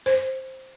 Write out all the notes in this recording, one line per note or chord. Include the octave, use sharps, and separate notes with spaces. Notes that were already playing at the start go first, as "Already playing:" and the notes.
C5